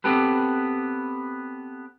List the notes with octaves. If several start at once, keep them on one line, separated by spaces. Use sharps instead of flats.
B3 C4 G4 A4 B4